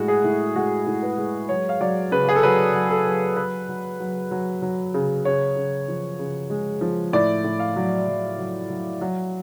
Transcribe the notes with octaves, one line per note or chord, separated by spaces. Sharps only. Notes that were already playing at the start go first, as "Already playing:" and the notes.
Already playing: A2 G#3 F#4
G#4
A2
G#3 F#4
A2
B4
G#3
F#3 C#5
F5
F#3 D5
C#3 B4
G#4
A4
F#3 B4
F#3
A4
F#3
F#3 B4
F#3
F#3
F#3
F#3
C#3
C#3 C#5
C#3
F3
C#3
G#3
F3
A2 D5
A2
F5
F#3
F#3
F#3
F#3
F#3